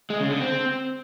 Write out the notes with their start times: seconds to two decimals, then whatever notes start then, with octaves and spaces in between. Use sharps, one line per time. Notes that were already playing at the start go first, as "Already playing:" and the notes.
0.10 G#3
0.20 C#3
0.30 D3
0.40 C4